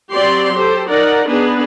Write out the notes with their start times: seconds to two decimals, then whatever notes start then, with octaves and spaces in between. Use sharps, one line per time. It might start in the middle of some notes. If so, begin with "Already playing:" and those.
0.11 F#3 C4 G4 D5 C6
0.54 G4 A4 C5
0.88 D#4 A#4 D5 F#5
1.27 B3 D4 D#4 G#4 B4